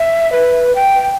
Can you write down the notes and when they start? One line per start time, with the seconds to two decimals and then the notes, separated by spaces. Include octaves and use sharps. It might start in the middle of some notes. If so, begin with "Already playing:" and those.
Already playing: E5
0.32 B4
0.75 G5